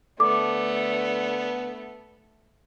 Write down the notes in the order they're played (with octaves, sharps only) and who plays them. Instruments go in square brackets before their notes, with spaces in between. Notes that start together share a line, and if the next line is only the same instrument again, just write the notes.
[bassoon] D3 [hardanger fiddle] A3 [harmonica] B3 [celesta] D6